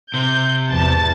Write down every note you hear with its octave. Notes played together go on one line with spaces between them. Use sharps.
C3 G6
G#1 E2 A5